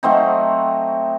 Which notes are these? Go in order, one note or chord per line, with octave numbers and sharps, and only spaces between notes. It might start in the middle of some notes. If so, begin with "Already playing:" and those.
F#3 A3 C4 D#4